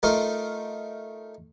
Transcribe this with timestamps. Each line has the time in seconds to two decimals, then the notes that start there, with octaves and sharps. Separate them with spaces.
0.03 A3 D#4 F4 A#4